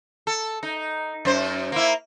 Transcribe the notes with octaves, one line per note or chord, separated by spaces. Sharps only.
A4
D#4
F#2 C5
A#3 E4